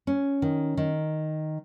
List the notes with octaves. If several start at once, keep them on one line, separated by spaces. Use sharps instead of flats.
C#4
D#3
D#3